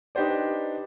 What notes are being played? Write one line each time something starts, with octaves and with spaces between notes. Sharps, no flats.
D4 D#4 G4 B4 C5 D5